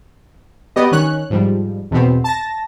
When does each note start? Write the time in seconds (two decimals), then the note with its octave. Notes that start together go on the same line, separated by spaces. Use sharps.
0.76 B3 G4 D5 D#5
0.92 D#3 C#4 C#5 F#6
1.30 G#2 F3 G3
1.91 E2 B2 B3 C4
2.24 A5 A#6